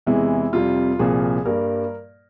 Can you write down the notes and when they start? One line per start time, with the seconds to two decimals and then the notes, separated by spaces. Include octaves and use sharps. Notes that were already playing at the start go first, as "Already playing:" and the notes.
0.07 E2 C3 E3 G#3 E4
0.53 F2 C3 G3 F4
0.99 C2 A#2 F3 G#4
1.45 G2 G3 A#3 A#4